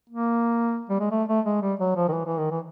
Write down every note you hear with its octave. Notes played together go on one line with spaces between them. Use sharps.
A#3
G3
G#3
A3
A3
G#3
G3
F#3
F3
D#3
E3
E3
D#3
E3